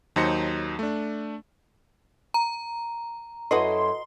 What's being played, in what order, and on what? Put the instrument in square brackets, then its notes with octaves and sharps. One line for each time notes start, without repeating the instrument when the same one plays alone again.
[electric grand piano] D#2 F#3 D#4 C5 A#6 C#7
A3 D4
[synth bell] A#5
[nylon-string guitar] F#2 E4 A4 [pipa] F#4 B4 D#5 [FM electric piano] C6